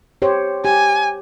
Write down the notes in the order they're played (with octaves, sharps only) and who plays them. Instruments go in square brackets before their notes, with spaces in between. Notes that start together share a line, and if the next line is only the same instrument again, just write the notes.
[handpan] G4 C5 C#5
[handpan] G4 [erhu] G#5